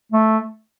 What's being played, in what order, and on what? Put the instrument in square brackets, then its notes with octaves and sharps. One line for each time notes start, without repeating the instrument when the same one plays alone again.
[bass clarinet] A3